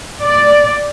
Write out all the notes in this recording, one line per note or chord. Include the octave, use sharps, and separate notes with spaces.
D5